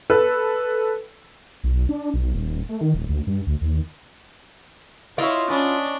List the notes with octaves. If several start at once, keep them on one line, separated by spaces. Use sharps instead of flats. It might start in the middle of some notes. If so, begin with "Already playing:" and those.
A4 B4
B1
D4
B1
D#1
A3
D#3
D#1
D2
G2
D2
D#2
E4 F4 C#5 D#5
C#4 D4 B5 D#6